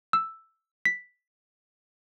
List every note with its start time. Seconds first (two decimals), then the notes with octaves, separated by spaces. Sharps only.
0.13 E6
0.85 B6